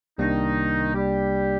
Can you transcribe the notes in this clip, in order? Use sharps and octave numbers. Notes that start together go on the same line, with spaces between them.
C2 C3 D#3 G3 A#3 D4 D#4
G3 G4